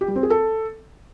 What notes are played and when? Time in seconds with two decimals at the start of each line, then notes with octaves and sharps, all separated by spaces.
0.01 G4
0.08 G3
0.16 C4
0.23 G#4
0.30 A4